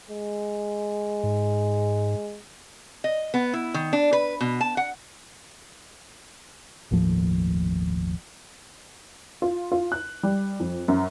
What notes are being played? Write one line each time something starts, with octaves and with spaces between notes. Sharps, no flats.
G#3
G#2
D#5
B3
E4
D#3
D4
B4
B2
A5
F#5
G1 D#2 A2 F3
F4
F4
F#6
G3
F2
F#2